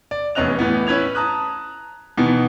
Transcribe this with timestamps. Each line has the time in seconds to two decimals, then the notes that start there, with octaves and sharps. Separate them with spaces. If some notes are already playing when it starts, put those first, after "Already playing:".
0.11 D5
0.35 F1 E2 C#4 D#5 F#6 F7
0.59 A2 E3 B3
0.87 C#4 E4 B4 G#6 F7
1.15 A5 A#5 D#6 F#6
2.17 B2 D#3 E3 B3